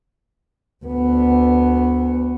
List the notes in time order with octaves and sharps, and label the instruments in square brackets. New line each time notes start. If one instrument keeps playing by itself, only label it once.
[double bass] D2 B3